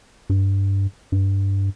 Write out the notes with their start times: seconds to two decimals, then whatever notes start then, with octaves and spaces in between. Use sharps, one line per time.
0.30 G2
1.12 G2